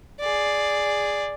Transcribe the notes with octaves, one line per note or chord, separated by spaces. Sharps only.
G#4 D5